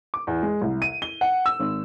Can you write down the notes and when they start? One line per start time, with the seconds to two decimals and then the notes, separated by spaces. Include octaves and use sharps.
0.14 D6
0.27 E2
0.42 G#3
0.62 C2
0.82 D#7
1.02 G7
1.21 F#5
1.46 E6
1.60 G#1